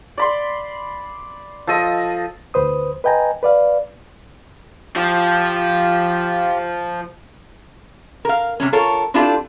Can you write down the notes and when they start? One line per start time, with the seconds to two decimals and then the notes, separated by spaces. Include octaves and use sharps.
0.18 D5 B5 C6
1.67 F3 A4 D#5
2.54 D2 B4 C5 D#6
3.04 B4 D#5 G5 G#5 A#5
3.43 B4 D5 F5
4.96 F3 F4 G4
8.25 A#4 F5
8.60 C3 G3 C#4
8.73 F4 A4 A#4 C#5
9.14 C4 D4 E4 F4 G4 A4